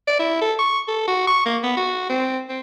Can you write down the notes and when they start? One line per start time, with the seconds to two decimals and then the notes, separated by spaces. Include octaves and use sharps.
0.07 D5
0.19 E4
0.41 A4
0.59 C#6
0.88 A4
1.07 F#4
1.27 C#6
1.46 A#3
1.63 B3
1.77 F#4
2.09 C4
2.49 C4